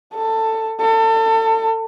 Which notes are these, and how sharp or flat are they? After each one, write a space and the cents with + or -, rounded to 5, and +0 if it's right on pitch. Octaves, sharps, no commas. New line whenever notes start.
A4 +15
A4 +30